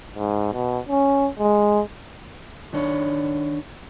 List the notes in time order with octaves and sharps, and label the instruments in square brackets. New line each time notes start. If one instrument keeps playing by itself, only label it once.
[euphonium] G#2
B2
C#4
G#3
[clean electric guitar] D#3 D4 C#5